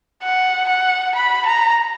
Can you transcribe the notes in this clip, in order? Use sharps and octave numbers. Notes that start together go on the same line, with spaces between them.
F#5
F#5
B5
A#5